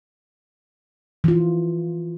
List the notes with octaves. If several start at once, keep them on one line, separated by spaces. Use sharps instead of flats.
E3 F4